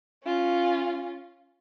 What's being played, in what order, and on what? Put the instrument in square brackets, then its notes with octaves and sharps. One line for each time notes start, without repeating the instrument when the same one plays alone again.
[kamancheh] C#4 F4